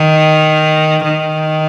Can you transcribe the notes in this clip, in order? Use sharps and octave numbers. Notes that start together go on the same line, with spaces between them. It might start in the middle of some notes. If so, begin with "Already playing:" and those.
Already playing: D#3
D#3